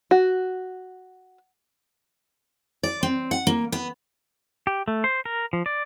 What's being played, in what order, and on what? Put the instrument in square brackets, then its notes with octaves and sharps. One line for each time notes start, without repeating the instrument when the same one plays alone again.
[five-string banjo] F#4
[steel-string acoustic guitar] D5
C4
F#5
A#3
B3
[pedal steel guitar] G4
A3
C5
A#4
F3
D5